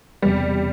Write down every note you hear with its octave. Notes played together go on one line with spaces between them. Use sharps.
E1 E2 C3 G3